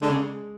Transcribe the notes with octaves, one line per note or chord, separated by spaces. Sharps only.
D3 G#3
C#3